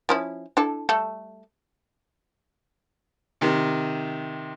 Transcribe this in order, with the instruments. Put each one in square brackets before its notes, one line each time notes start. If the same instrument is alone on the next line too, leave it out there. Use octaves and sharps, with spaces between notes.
[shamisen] F3 C#4 E4
D4 E4 A4
G3 A3 A4
[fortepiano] C3 D#3